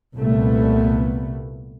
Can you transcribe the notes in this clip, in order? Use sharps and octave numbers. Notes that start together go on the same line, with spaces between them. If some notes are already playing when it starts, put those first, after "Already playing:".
C2 A#2 A3 B3